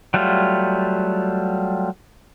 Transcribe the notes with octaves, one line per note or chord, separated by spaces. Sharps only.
F#3 G3 A3 F4